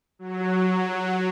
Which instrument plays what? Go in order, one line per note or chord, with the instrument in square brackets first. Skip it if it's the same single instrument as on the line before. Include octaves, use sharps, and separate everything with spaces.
[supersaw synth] F#3